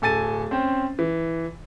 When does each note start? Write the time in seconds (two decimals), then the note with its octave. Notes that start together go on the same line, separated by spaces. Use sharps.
0.02 D1 A4 G#5 A6 D#7
0.51 C4 C#4 C5 G5
0.99 E3